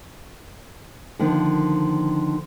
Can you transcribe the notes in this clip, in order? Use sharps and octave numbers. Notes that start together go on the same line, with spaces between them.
D3 D#3 F3 A#3